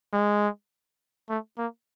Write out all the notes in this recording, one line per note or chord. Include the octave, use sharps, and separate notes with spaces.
G#3
A3
A#3